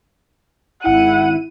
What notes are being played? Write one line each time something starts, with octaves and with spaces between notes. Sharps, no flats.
G#1 E4 F#5 D#7